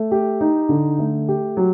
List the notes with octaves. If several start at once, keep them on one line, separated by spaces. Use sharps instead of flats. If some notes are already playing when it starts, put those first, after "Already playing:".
Already playing: A3
G4
D#4
D3
A3
G4
F#3